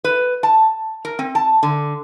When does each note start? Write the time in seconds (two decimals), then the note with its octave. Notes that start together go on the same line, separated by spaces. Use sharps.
0.04 B4
0.43 A5
1.05 A#4
1.19 C4
1.35 A5
1.63 D3